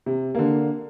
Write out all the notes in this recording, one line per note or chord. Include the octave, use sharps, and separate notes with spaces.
C3
D3 A#3